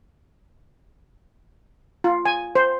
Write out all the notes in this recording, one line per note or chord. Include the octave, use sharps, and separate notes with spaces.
F4
G#5
C5